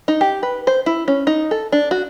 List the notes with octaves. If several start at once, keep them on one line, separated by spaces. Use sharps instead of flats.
D#4
G4
B4
C5
E4
C#4
D#4
A4
D4
F#4